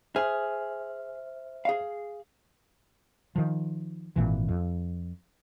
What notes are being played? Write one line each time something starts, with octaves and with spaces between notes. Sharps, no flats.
G#4 C5 E5 F6
G#4 F5
D#3 F3
G#1 A#2 E3
F2